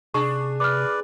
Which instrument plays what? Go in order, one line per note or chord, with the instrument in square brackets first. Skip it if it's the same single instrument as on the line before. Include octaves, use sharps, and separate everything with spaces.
[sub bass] C3 [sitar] D4 G#4 [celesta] C#6
[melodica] B4 D5 [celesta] D6 F6